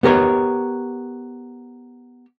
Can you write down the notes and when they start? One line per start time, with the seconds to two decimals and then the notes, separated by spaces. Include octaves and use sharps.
0.03 B3 G4 A#4 C#5